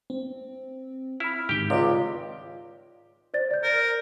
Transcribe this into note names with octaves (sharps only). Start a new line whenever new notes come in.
C4
E4 B5 F6
G#2 D#3 G4 G5
C#2 C3 F4 D5 D#5
C5 D5 A6
D5 G6
A#4 G6